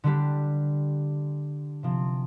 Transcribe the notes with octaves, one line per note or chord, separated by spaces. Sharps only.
D3 G3 D4 G4
C3 F3 C4